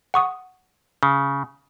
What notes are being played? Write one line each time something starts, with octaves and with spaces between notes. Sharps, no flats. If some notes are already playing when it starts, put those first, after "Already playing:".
F#5 C#6 D#6
C#3